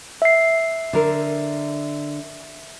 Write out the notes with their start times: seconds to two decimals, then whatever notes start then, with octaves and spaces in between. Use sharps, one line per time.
0.22 E5 C7
0.93 D3 A#4